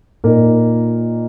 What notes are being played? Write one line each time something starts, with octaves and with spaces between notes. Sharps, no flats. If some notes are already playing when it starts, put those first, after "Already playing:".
A#2 A#3 D#4 A#4